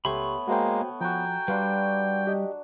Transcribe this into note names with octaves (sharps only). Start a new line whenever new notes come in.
C#2 A3 B3 G4 C#5 B5 C6
G#3 A#3 F#4 C5 G5
F3 F#4 G5 G#5 A#5
G3 D4 F#4 B4 F5 C6
G4 D#5